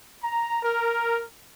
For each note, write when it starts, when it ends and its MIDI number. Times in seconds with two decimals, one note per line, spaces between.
0.23 0.62 82
0.63 1.25 70